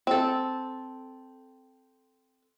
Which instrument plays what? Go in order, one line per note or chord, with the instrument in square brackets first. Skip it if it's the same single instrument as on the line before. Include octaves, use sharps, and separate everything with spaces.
[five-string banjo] C4 A4